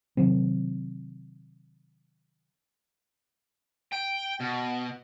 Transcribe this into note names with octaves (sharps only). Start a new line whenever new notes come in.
C3 D#3 F#3 C4
G5
B2